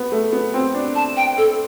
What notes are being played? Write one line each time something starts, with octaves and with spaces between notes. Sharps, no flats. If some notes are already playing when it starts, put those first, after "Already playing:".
Already playing: B3
A3
B3
C4
D4
A5
G5
A4